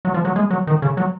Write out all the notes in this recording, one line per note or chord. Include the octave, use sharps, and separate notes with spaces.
F#3
F3
F#3
G#3
F#3
D#3
C#3
F#3